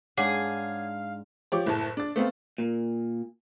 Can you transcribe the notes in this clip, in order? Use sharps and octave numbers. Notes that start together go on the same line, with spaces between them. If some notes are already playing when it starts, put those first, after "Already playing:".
G#2 D4 G#4 C#5 F5 F#5 D6
F3 G4 C#5 D6
F#1 A2 A5
D4 A6
A3 B3 C4 F5
A#2